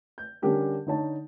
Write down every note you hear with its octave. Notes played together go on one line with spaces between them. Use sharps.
G6
D3 G3 C#4 D4 G4 A#4
D3 D#4 C#5 A5